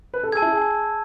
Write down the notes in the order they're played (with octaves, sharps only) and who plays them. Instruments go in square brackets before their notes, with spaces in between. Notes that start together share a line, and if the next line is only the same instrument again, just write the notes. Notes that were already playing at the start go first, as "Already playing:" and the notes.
[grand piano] B4
A4
[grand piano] G#4 [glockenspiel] G#6
[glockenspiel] A5 E6
[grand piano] E4
G#4